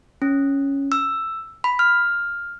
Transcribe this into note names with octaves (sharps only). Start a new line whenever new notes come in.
C#4
E6
B5
F6